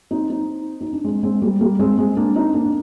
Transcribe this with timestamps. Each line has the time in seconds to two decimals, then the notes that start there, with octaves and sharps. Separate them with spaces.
0.11 C4 D#4
0.29 C4 D#4
0.81 D#4
0.93 D4
1.04 G#3 C4
1.23 G#3 C4
1.42 G3 A#3
1.61 G3 A#3
1.79 G#3 C4
1.98 G#3 C4
2.16 A#3 D4
2.35 C4 D#4
2.54 A#3 D4
2.64 D4